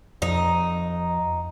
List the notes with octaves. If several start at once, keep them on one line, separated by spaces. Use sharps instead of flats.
F2 D#4